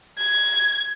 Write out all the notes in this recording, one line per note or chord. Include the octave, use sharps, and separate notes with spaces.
G#6